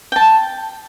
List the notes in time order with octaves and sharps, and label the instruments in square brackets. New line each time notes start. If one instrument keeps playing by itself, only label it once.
[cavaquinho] G5 A5